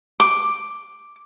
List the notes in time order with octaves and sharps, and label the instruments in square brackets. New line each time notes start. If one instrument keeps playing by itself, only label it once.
[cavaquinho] D6